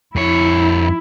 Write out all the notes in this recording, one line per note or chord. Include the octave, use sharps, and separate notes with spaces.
F2 E4 C#5